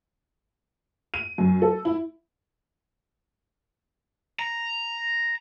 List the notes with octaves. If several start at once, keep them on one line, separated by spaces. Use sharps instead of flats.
D#7
F#2
A4
E4
A#5